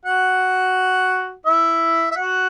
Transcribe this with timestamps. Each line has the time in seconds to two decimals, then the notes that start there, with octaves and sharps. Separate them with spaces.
0.05 F#4 F#5
1.45 E4 E5
2.11 E5
2.16 F#4 F#5